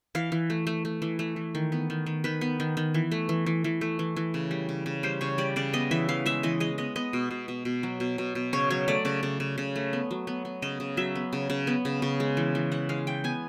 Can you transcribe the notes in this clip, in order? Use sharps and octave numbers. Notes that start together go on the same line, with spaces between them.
E3 F5
E3
A3
A3
A3
E3
A3
E3
D#3
B3
D#3
D#3
D#3 B4
B3
D#3
D#3
E3
A3
E3
E3
E3
A3
E3
E3
C#3
G3
C#3
C#3
G3 C5
C#3 C#5
G3 D5
C#3 D5
B3 D#5
E3 E5
E3 F5
G#3 E5
E3 D#5
G#3 D#5
B3 D#5
B3 D#5
B2
B2
B2
B2
F#3
B2
B2
B2
C#3 C#5
F#3 C#5
A3 D5
C#3 D5
C#3
C#3
C#3
A3
B3
F#3
B3
B3
C#3 D#5
C#3
F#3 E5
B3
C#3
C#3
B3
C#3
C#3
G#3
E3
E3
E3 F#5
G#3 F5
E3 G5
B3 G#5